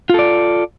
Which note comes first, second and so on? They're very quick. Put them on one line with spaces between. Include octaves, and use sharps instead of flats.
F4 A4 D5